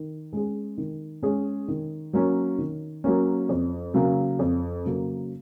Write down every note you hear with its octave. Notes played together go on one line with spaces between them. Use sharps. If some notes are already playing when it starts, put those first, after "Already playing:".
Already playing: D#3
G#3 C#4 G#4
D#3
G#3 C#4 G#4
D#3
F#3 A#3 C#4
D#3
F#3 A#3 C#4
F2
C#3 F#3 A#3
F2
C#3 F#3 A#3